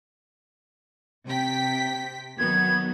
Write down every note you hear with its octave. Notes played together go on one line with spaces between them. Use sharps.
C3 G5 B6
D#3 F#3 B3 G#6